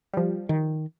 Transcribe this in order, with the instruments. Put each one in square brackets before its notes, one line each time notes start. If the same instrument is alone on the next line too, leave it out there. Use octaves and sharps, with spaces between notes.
[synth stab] F3 G3
[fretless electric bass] D#3